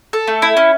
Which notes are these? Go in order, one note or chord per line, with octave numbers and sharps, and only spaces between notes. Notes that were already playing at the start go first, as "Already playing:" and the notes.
A4
A3
E4
C#4